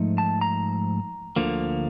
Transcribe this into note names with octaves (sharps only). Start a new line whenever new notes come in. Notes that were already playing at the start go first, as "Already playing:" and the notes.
Already playing: G#2 F3 A3 D#4
A5
A#5
D2 D3 F3 A#3